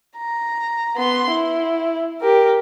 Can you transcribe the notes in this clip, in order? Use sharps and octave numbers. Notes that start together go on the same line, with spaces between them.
A#5
B3 C6
E4
G4 A#4